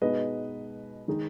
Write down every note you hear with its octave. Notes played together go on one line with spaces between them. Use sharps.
B2 G#3 B3 D#4 B4 D#5
D#3 G#3 D#4